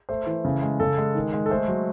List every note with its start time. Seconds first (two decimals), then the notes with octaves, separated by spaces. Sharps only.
0.09 A3 C5
0.27 E3
0.45 C#3
0.62 G#3
0.80 C#3 A4
0.98 G#3
1.15 D#3
1.34 G#3
1.46 A4
1.50 A3 C5
1.68 F#3